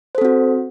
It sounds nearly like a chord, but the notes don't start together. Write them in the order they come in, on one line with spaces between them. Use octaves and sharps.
C5 A4 C4 F#4